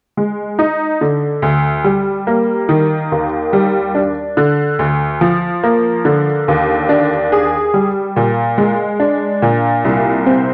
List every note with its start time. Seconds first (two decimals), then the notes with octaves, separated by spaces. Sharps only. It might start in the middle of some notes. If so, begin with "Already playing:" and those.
0.17 G#3
0.59 D#4
1.01 D3
1.42 D2
1.84 G3
2.27 A#3
2.69 D#3
3.12 D#2
3.53 G3
3.95 D4
4.37 D3
4.79 D2
5.21 F3
5.63 A#3
6.05 D3
6.48 D#2
6.89 D4
7.32 G#4
7.74 G3
8.16 A#2
8.58 G#3
9.00 D4
9.42 A#2
9.85 C2
10.26 C4